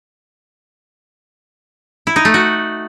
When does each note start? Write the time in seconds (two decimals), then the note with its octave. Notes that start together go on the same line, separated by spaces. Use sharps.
2.07 E4
2.16 D#4
2.25 A3
2.34 F#4